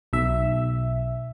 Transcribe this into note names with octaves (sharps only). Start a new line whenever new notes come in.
B1 E5